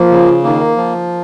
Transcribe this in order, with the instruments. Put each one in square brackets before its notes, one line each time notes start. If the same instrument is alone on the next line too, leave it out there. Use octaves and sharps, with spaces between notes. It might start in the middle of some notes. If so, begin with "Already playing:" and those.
Already playing: [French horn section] F3 [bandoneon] A#3
[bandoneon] C#3
[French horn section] D#3 [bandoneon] A#3
[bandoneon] F3